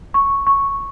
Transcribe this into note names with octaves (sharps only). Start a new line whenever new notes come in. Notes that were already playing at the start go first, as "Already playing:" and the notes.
C#6
C#6